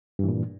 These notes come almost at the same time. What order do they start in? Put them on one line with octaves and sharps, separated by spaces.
G2 E3 A#2